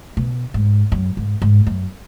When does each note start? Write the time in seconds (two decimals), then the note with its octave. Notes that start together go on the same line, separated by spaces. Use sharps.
0.17 B2
0.54 G#2
0.92 F#2
1.17 G#2
1.42 G#2
1.67 F#2